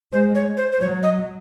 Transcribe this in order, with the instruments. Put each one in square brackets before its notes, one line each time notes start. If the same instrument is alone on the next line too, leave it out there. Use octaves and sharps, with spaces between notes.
[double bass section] G#3 [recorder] C5
[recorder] C#5
C5
C5
[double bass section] F#3 [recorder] C#5
[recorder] D#5